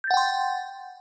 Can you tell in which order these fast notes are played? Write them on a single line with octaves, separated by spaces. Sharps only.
G6 A6 F#5 G5 C6